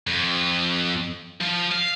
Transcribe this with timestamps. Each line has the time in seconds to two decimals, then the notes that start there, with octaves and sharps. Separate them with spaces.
0.07 F2
1.41 F3
1.71 F5